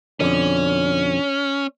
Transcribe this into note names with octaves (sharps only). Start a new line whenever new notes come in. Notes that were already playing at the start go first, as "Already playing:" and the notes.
F2 B2 D3 C#4